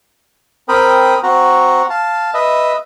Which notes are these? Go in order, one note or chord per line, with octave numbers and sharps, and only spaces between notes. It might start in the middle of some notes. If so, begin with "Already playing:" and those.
C4 A#4 G5 B5 D#6
C4 F#4 F#5 A#5
F5 A5
B4 D#5 E5